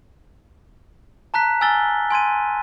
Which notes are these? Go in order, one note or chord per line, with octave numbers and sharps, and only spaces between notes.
A5 A#5 F#6 B6
G#5 E6 F6 A6 G7
G#5 C6 G#6 D#7